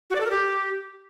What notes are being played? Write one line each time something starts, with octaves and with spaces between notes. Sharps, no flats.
F#4
D5
A4
A#4
G4